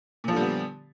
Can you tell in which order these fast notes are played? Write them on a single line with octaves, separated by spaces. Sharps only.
A#2 F3 D3 G3 B3